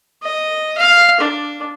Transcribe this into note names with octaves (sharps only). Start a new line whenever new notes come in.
D#5
F5
D4